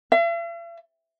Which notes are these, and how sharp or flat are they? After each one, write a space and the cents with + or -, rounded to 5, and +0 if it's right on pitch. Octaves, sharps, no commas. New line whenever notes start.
E5 +45